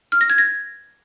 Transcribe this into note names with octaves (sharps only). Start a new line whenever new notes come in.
F6
A#6
G#6
A#6